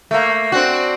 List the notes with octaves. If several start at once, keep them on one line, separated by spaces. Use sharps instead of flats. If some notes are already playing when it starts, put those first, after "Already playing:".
A3 A#3
C4 D4 F#4